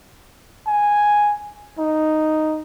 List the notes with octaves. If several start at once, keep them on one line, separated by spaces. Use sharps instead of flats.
G#5
D#4